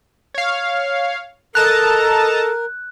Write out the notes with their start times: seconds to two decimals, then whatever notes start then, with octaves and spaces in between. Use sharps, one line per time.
0.34 C#5 F5
1.55 A4 A#4 D#5 A5 A#5 F#6